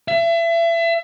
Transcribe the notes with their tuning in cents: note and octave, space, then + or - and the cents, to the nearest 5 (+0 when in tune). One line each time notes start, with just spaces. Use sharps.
E5 +30